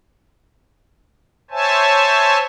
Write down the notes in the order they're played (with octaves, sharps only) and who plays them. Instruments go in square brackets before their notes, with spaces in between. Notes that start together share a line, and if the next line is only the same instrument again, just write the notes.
[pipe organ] C5 C#5 E5 G#5 A5